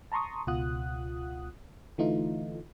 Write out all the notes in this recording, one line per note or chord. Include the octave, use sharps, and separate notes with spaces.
A5 A#5 C6 C#6 D#6
C#2 B2 F4 F#5 D#6 F#6
D3 E3 A3 D#4 F4